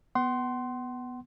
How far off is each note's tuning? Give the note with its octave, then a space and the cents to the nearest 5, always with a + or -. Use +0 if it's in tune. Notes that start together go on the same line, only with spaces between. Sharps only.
B3 +0 F#5 +35 C6 +0